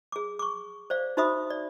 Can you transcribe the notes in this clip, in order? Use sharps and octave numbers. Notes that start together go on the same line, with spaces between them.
G#4 D6
C#6 D6
C5 D5 F5
D#4 F#4 C5 E5 B5 D#6
D5